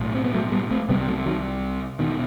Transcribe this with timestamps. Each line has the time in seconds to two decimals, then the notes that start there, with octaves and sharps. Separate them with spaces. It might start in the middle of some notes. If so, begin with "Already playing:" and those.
Already playing: B1 A2
0.14 C4
0.24 B3
0.34 F#3 A3
0.52 G3 B3
0.71 A3 C4
0.89 C2 C3 G3 B3
1.07 F#3 A3
1.26 D#3 F#3
1.99 E1 E2 B2 D#3